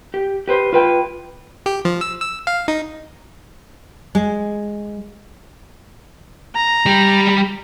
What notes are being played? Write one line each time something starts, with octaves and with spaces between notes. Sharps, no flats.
G4
G4 B4 C5
F4 B4 G5
G4
F3
E6
E6
F5
D#4
G#3
A#5
G3 G4